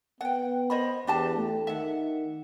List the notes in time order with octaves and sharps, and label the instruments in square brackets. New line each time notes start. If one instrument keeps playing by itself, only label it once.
[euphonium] B3 [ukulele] F#5 G5
[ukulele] C5 D#5 B5
[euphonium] E2 [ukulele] D4 G4 A5
[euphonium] A3
[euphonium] D#3 [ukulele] E5 F#5